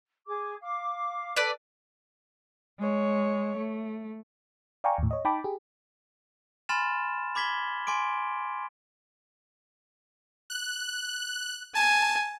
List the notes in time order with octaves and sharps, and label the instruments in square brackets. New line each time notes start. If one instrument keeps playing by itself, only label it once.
[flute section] G#4 D6
F5 D6
[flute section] A4 [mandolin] B4 D5
[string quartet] G#3 C#5
A3
[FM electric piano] D5 F5 G5 G#5 A#5 C#6
D#2 A2
C#5 D#5
D#4 G5 A5 B5 D6
G4 G#4
[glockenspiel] G#5 B5 C6 F6 A6 E7
B5 D6 G#6 B6 F#7 G7
G#5 C6 D6 D7
[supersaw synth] F#6
[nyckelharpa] G#5 [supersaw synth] A5